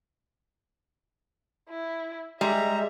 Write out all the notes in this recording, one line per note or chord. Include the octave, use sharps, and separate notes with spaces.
E4
G3 G#3 E5 A#5